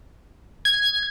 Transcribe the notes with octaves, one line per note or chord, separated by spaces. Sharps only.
G#6